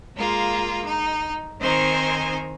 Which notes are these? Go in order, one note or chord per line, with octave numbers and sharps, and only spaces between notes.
G#3 A#3 F4
D#4
D#3 C4 D#4 C5 G#5 A#5